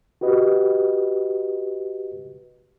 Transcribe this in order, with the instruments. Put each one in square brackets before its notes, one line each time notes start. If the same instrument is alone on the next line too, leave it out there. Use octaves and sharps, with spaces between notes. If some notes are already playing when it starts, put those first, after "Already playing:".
[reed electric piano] F#4 G4 B4 D#5